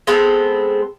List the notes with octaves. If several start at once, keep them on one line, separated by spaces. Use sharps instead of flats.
G#3 B3 C4 A4